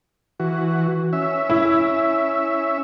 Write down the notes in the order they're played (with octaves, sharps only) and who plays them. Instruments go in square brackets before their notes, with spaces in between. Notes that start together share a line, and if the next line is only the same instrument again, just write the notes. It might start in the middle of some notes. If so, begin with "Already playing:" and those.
[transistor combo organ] E3 F#4
C#4 E5
[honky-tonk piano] E4